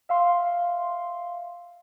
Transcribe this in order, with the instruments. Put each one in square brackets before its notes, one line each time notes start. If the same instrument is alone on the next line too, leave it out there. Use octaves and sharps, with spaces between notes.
[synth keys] E5 F5 C6